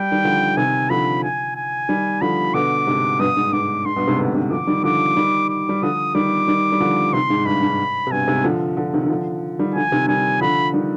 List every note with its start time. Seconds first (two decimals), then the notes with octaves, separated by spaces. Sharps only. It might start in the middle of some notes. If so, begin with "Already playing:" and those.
Already playing: G3 G5
0.12 D#3 G3
0.24 D3 F3
0.57 C3 D#3 G#5
0.90 D3 F3 B5
1.23 G#5
1.56 G#5
1.89 D#3 G3
2.21 D3 F3 B5
2.54 B2 D3 D6
2.87 G#2 C3
3.19 G2 B2 D#6
3.37 G#2
3.53 G#2 D6
3.85 G#2 C6
3.96 G2 B2
4.07 G#2 C3
4.18 B2 D3
4.35 C3 D#3
4.51 D3 F3 D6
4.67 D#3 G3
4.83 D3 F3 D6
5.16 D#3 G3
5.49 D6
5.69 G3
5.82 D3 F3 D#6
6.15 D#3 G3 D6
6.48 D#3 G3
6.72 G3
6.80 D3 F3
7.13 C3 D#3 C6
7.30 G#2
7.46 G2 B5
7.63 G#2
8.07 C3
8.11 G2 B2 G#5
8.28 G#2 C3
8.44 D3 F3
8.77 D3 F3
8.93 C3 D#3
9.05 D#3
9.10 D3 F3
9.59 D#3 G3
9.75 D3 F3 G#5
9.92 C3 D#3
10.08 D#3 G3 G#5
10.41 D3 F3 B5
10.73 D#3 G3